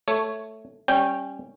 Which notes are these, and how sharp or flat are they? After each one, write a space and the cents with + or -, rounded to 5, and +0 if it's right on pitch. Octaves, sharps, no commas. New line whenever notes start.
A3 +0 C#5 +0
G3 +0 C#4 -20 G5 +0